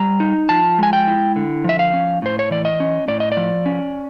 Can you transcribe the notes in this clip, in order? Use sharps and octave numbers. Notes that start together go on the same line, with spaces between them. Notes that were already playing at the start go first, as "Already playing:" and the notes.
Already playing: G3 A#5
D#4
F3 A5
G#3 G#5
G5
E4
D3
F3 E5
F5
C#4
A2 C5
C#5
E3 D5
D#5
C#4
A2 D5
D#5
D5
F3
C#4